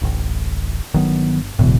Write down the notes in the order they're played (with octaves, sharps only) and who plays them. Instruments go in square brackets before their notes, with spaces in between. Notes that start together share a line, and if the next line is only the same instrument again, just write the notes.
[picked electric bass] D1 A1
[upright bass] G1 [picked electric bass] D#3 F#3 B3
[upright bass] E1 [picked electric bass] A2 D3 E3